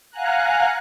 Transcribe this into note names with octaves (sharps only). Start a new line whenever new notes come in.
F5 F#5 G#5 A#5 F#6